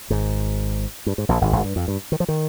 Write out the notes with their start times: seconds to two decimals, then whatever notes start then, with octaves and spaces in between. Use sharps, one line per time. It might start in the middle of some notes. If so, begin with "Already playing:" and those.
0.10 G#1 G#2
1.06 G2
1.18 G#2
1.29 A#1 A#2
1.41 G#1 G#2
1.52 G#1 G#2
1.64 G2
1.76 F2
1.88 G2
2.12 D#3
2.20 F3
2.28 D#3